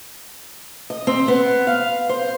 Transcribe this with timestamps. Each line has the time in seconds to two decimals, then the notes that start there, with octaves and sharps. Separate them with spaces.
0.90 D#5
1.07 C4
1.28 B3
1.67 F5
2.09 C5